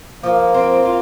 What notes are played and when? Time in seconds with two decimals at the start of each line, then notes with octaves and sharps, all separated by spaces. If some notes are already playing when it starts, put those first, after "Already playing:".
0.23 F3 A#3
0.54 C4
0.85 F4